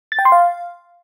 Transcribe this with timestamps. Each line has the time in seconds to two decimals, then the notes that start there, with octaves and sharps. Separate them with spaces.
0.12 A6
0.19 G5
0.25 C6
0.32 F5